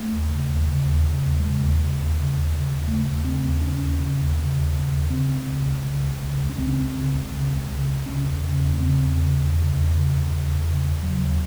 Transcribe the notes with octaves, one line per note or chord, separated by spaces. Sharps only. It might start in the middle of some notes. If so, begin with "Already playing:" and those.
Already playing: A3
D#2
C#3
D#2
C#3
D#2
C#3
D#2
C#3 G#3
D#2
C#3
D#2
C#3
D#2
C#3
D#2
C#3 A3
D#2
C#3 C4
D#2
C#3 C#4
D#2
C#3
D#2
C#3
D#2
C#3
D#2
C#3 C4
C#2
C#3
C#2
C#3
C#2
C#3
C#2
C#4
C#3 C4
C#2
C#3
C#2
C#3
C#2
C#3
C#2
C#3 C#4
E2
C#3
E2
A3
C#3 C4
E2
C#3
E2
C#3
E2
C#3
E2
C#3
E2
C#3
E2
C#3 F#3
D#2